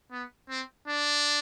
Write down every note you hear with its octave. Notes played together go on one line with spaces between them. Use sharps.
B3
C4
D4